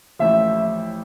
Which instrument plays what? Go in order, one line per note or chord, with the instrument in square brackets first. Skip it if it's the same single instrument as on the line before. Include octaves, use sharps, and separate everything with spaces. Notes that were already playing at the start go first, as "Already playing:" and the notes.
[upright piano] A1 A2 F3 [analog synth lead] E5